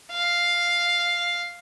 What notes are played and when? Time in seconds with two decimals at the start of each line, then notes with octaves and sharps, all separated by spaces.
0.13 F5